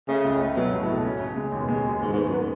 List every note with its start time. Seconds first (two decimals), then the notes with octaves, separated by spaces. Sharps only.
0.08 C#3 A3
0.25 C#2
0.41 A3
0.56 B2 F#3
0.72 C#2
0.81 A2
0.88 B2
1.05 C#4
1.21 C#3
1.36 G#3
1.52 D#2 B2
1.68 G#3
1.84 D#2
2.01 G#2 D#3
2.13 G#2
2.17 B3
2.28 F#2
2.32 B3